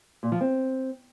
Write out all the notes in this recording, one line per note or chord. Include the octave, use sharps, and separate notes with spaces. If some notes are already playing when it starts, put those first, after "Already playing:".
A#2
F3
C4